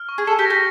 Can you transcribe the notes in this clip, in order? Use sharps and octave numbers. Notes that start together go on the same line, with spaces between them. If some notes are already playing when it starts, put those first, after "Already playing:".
Already playing: F6
C#6
G#4
A4 C#7
G4
A#6
G4